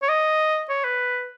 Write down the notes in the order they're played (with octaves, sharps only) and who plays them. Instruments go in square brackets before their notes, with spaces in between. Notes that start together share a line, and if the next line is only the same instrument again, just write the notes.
[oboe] C#5
D#5
C#5
B4